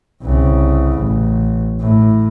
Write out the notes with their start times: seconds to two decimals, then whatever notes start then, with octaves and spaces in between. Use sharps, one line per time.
0.22 C2 C#3
0.97 A1
1.80 A2